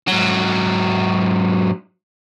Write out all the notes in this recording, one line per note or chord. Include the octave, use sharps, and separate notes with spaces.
G#2 F#3